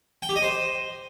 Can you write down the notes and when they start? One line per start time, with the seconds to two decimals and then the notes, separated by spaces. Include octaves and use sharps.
0.22 G5
0.29 G4
0.36 D#5
0.43 C5